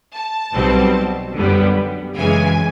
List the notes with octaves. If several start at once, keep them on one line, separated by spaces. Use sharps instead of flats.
A5
B1 B2 G3 C4
F#2 D3 G3 B3
F#2 C#3 E3 G#3 G#5